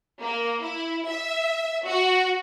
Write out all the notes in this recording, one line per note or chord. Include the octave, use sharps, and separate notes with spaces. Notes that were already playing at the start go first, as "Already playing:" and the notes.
A#3
E4
E5
F#4